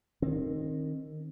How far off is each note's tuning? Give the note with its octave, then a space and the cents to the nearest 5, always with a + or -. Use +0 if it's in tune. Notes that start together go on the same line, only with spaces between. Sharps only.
D#3 -10 C4 +30